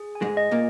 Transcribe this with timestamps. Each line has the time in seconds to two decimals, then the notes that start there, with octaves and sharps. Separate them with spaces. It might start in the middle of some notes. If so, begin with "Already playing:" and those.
Already playing: G#4
0.15 G#5
0.22 G#2 G#3
0.37 D#5
0.51 A#2 A#3